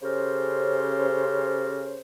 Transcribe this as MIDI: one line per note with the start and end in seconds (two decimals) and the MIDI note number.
0.02 1.99 49
0.02 1.99 61
0.02 1.99 67
0.02 1.99 69
0.02 1.99 70
0.02 1.99 72